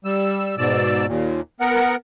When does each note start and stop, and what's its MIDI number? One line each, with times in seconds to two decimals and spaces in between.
0.05 0.55 55
0.05 0.55 88
0.58 1.06 44
0.58 1.06 47
0.58 1.06 74
0.58 1.06 88
1.07 1.41 39
1.07 1.41 46
1.60 1.96 59
1.60 1.96 70
1.60 1.96 78